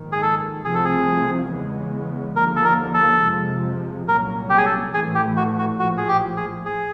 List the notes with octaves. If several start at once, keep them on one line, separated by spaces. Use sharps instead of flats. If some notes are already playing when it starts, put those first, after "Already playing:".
Already playing: A#1 G#2 D#3
G#4
A4
C2 C3 F3 A3 C4 G#4
A4
G#4
E2 C#3 E3 G#3 B3
D#2 D3 F3 A#3 A#4
A4
A#4
A4
F2 C3 F3 G#3
C2 A#2 F#3 A#3 C#4 A#4
G4
G#4
A4
A1 A2 E3 A3 G#4
G4
F#4
F#4
A#1 A2 F3 F#4
G#4
G4
G#4
G#4